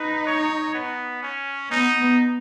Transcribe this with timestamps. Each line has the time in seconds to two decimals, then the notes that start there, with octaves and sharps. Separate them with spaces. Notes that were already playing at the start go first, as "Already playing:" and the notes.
Already playing: D#4 B4
0.27 C#5
0.75 B3
1.23 C#4
1.71 B3 D#4